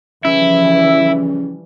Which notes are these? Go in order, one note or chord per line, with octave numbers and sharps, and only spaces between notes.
C#3 E3 F3 G3 E4 E5